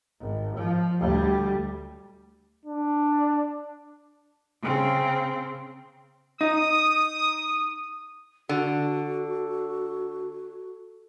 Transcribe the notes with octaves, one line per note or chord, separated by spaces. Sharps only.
G#1
F3
D2 G3
D4
C#3 C4
D#4 D#6
D3 F#4